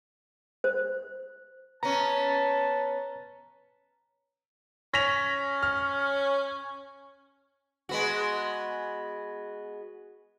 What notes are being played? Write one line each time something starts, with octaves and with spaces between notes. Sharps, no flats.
C5
B3 C#4 A5 A#5
C#4 A#6 B6 F7
F6
G#3 B3 F#4